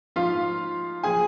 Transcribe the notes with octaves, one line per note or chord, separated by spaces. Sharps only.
G#2 F3 F4 F5
F3 G#4 G#5